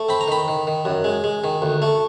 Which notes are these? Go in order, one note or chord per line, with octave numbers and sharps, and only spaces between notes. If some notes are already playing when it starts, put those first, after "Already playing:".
Already playing: A3
C4 B5
A#5
D#3 B5
D#3
D#3
F#2
G#3
G#3
D#3
D2
A3